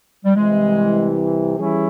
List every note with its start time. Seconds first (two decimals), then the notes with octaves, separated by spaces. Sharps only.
0.25 G3
0.35 C2 C3 E3 G#3
1.58 E3 G3 C#4 E4 G#4